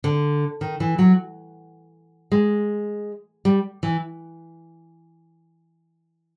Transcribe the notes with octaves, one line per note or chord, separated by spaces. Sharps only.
D3
D#3
E3
F#3
G#3
G3
E3